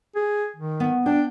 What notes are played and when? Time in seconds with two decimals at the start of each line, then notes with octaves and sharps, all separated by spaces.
0.16 G#4
0.56 D#3
0.80 B3
1.06 D4 G5